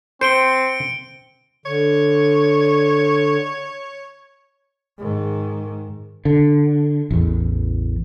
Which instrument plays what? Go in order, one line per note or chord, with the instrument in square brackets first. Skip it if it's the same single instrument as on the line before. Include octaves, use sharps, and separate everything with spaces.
[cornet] C4 [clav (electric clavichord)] C5 [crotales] C#7 D7 G7
[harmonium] D3 [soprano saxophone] C#5
[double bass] G#2 D#3
[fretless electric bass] D3
A1 E2